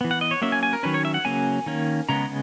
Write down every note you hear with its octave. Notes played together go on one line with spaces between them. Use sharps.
E3 B3
F#5
D#5
C#5
F#3 A#3 C#4 E5
G#5
G#5
A#4
D#3 F#3 C#4 B4
C#5
E5
F#5
C#3 F#3 A#3 C#4 G#5
D#3 A#3 C#4
C#3 G#3 B3 A#5